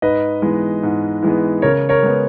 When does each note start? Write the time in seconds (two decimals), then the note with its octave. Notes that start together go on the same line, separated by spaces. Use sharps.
0.02 G#2 B4 D#5
0.42 E3 G#3 B3
0.83 G#2
1.22 E3 G#3 B3
1.62 C#3 A#4 C#5
1.89 A#4 C#5
2.03 G#3 B3